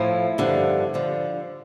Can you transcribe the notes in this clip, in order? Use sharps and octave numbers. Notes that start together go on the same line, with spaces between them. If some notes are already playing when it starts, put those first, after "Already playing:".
Already playing: A2 F3 E4
G2 D3 F3
D3 F3